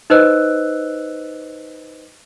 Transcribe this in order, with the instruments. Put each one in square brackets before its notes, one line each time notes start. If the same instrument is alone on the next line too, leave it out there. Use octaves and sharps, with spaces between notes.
[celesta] D#4 B4 C5 D#5 E6 F#6